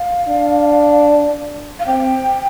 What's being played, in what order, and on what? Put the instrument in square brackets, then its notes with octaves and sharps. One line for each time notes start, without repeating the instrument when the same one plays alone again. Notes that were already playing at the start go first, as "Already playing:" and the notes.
Already playing: [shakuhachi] F5
[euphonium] D4
[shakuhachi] F5
[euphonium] C4 [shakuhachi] G5